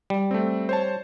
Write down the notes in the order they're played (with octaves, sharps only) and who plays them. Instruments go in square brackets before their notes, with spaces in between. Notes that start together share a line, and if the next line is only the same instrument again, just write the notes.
[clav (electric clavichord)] G3
[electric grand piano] A3 C4
C5 C#5 A5